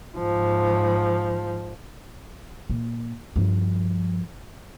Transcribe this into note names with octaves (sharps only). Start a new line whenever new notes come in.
G#2 F3
A#2
G2 F3